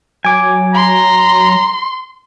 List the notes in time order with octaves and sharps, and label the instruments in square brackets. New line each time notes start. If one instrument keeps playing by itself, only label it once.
[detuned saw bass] F#3 [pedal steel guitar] G#5 D6
[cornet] A#5 [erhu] C6